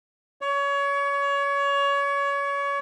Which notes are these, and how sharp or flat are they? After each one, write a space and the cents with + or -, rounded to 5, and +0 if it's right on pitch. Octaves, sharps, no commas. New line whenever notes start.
C#5 +25